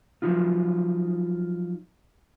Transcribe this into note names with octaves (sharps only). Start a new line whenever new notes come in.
F3 F#3 D#4 F4